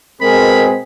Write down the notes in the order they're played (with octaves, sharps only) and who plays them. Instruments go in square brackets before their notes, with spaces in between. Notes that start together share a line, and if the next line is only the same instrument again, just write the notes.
[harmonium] B2 G#4 [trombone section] G#3 C4 [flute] A#4 [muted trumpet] B5